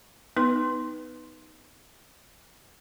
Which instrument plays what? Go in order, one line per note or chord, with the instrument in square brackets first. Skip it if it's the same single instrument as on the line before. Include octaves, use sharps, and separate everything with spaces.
[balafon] B3 D#4 B4 C6